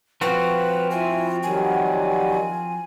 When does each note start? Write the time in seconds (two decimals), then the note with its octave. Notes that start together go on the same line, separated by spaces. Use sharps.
0.21 F3 C4 F#4 B4
0.91 E4 F4 G#5
1.43 D#3 F#3 G3 G#5